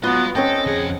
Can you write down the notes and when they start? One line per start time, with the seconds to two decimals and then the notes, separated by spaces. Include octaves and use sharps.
0.04 F#3 B3 F4 B4 D#5 C6
0.35 C4 C#4 A4 C#5 D#5 G5
0.67 F2 G#4 F#5